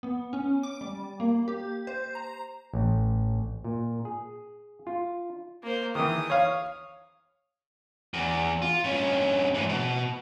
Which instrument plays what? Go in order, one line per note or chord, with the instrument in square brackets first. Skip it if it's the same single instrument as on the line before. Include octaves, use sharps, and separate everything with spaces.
[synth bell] B3
C#4
D6
G3
A#3
G4
C5
A#5
[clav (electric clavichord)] A1
A#2
G#4
F4
[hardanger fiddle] A#3 C5
[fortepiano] D#3 E3 [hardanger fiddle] D#6
[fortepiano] C#5 F5
[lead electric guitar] E2
F4
G2 C#4
G#2 E3
B2